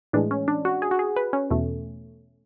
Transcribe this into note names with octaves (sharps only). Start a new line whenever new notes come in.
A2 E3 G#3 D4
C#4
D4
F#4
G#4
F#4
G#4
B4
C#4
E2 B2 A3